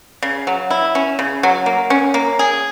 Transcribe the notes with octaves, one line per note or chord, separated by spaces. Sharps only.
C#3
F#3
E4
C#4
C#3
F#3
A#3
C#4
A#3
G#4